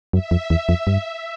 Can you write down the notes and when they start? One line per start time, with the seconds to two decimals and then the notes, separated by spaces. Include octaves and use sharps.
0.13 F#2 E5
0.31 F2
0.50 E2
0.69 F2
0.87 G2